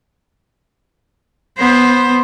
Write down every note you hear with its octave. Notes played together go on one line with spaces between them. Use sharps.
B3 C5